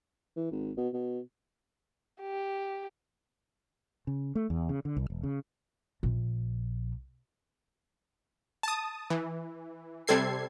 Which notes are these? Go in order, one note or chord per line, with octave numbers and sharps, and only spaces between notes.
E3
G#1
B2
B2
G4
C#3
A3
E2
C#3
D3
C2
E1
C#3
A#1
A5 D#6
E3
C3 G3 C4 A4 G#6 C7